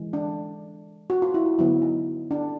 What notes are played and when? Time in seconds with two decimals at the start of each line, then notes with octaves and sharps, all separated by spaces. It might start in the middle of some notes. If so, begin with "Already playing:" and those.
Already playing: E3 G#3
0.13 D4
1.10 F#4
1.22 F4
1.34 E4
1.46 F4
1.58 D3 F#3 B3 E4
1.82 D#4
2.31 D4